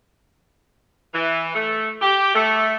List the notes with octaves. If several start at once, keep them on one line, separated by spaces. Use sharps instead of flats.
E3
A3
G4
A3